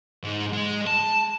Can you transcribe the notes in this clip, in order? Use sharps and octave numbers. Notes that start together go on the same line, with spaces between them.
G#2
G#3
A5